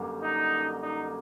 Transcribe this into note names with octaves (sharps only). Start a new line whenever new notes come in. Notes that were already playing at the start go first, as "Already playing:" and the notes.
Already playing: F#2 D3 G3 A#3
D#4
D#4